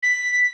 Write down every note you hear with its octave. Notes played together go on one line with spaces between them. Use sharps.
B6